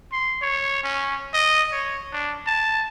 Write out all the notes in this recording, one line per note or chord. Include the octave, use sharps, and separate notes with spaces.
C6
C#5
C#4
D#5
C#5
D4
A5